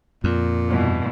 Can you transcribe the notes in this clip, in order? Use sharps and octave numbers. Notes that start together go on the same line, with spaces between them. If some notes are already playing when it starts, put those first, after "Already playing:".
F2 A#2
G2 B2 E3